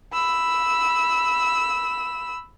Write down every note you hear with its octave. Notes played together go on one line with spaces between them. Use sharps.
B5 E6